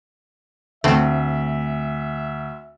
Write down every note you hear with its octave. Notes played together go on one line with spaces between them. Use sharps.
D2 A3 C4 E5